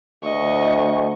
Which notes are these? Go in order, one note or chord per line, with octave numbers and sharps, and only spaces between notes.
D2 D#5 C#6